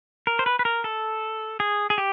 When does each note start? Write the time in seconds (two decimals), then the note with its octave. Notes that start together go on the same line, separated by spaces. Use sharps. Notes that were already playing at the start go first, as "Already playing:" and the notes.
0.27 A#4
0.39 C5
0.46 B4
0.59 B4
0.65 A#4
0.84 A4
1.60 G#4
1.90 G#4
1.98 G4